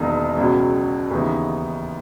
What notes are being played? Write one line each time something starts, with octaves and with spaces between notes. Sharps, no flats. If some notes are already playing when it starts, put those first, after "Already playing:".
Already playing: E1 E2 D#3 A#3 D#4
C#2 B2 F#3
D#2 C#3 E3 B3 D#4